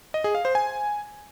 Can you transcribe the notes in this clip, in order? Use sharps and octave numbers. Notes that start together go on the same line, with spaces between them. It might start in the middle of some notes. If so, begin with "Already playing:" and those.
D#5
G#4
F5
C5
G#5